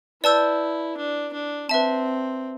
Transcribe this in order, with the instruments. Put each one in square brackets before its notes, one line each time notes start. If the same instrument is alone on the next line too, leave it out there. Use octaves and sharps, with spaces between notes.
[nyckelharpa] E4 [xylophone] B4 D5 A5 E6 G6
[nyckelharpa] D4
D4
[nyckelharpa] C4 [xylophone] B4 E5 A5